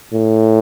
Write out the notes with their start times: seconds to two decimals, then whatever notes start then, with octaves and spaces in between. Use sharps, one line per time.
0.13 A2